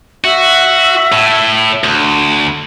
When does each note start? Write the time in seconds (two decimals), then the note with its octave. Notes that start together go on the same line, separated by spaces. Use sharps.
0.24 F#4 E5
1.12 A2
1.84 D2